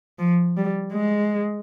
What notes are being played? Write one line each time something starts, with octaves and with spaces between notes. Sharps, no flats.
F3
G3
G#3